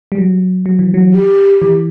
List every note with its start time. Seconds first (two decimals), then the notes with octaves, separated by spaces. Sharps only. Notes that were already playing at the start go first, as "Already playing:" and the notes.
0.12 G3
0.18 F#3
0.66 F#3
0.79 E3
0.94 F#3
1.13 G4
1.62 E3